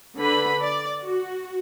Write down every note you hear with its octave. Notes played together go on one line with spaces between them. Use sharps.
D3 B4 B5
D5
F#4